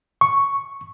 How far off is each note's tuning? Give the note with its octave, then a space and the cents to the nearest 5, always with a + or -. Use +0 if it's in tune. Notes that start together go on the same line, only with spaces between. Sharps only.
C#6 +0